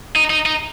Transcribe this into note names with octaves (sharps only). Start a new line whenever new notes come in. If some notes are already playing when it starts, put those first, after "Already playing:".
D#4
D#4
D#4